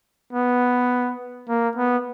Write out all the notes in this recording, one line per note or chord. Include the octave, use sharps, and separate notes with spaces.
B3
A#3
B3